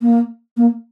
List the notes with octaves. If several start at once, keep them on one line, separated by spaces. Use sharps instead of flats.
A#3
A#3